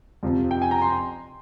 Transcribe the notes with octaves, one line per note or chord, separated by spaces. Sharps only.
F2 C3 F3
G5
G#5
A#5
C6